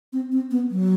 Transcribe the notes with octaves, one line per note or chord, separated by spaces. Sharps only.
C4
C4
B3
F#3